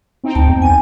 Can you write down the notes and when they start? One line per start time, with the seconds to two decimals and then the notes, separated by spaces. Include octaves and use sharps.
0.24 C4 D#4 G5
0.35 D2 A5
0.48 E2
0.62 B1 G#5 D#7